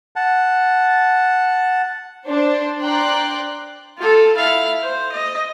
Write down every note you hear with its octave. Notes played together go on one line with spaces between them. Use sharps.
F#5 A5
D4 C5
D5 G5 A#5 C6 F#6
F4 A4
E4 F5
C5
D#5